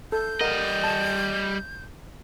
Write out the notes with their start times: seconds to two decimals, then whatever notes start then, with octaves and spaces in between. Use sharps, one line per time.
0.12 A4 G6
0.41 G3 A#4 D#5 F#5
0.84 A5